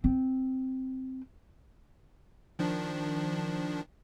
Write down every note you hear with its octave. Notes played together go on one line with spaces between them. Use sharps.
C4
D#3 F3 D4